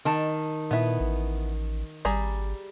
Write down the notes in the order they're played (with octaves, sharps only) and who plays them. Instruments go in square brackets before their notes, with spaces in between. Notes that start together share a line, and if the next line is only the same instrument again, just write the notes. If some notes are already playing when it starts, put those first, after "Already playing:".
[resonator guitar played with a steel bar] D#3 A5
[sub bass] A#2 [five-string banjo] B3 E4
[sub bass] A1
[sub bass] G#1 [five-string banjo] G3 G#4 A#5